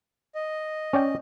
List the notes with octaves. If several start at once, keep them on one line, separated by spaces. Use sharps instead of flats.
D#5
C#4 D5 G5